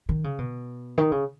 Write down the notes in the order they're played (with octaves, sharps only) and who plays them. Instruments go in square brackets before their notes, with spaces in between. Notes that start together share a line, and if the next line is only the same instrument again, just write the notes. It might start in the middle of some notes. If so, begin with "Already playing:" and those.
[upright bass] D#3
C#3
B2
D#3
C#3